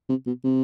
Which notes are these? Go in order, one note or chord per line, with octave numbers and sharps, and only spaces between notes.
C3
B2
C3